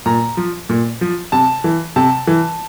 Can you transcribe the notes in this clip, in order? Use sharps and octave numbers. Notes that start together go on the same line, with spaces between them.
A#2 A#5
F3
A#2
F3
C3 A5
E3
C3 A5
E3